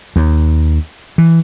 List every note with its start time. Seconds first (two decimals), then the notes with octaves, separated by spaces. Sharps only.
0.16 D#2
1.18 E3